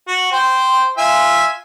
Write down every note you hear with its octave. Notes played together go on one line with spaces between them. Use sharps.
F#4
C5 G5
F4 E5 G#5